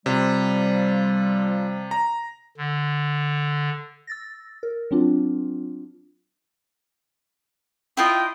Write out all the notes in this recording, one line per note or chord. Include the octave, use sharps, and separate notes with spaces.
C3 F3 G3
A#5
D3
E6 A6 A#6
A#4
F#3 C4 D4 F4
E4 F4 D#5 G5